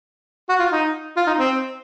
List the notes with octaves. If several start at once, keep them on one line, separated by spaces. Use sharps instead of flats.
F#4
F4
D#4
F4
D#4
C4